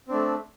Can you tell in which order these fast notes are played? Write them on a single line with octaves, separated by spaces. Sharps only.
C4 D4 A3